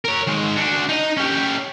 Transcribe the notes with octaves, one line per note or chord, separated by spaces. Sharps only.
A#4 C#5
D#3 G#3
D4 F#4
D#4 D#5
C#4 G4